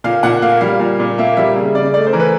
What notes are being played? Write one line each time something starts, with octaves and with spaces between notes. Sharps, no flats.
A#2 F5
A#2 F#5
A#3 F5
G3 F5
A#2
A#2
A#3 E5
G3 E5
C#3
C#3 D5
A3 D5
C5
E3 A#4
B4